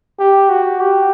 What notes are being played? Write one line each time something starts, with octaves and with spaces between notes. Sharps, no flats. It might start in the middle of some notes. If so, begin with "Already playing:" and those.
G4
F#4
G4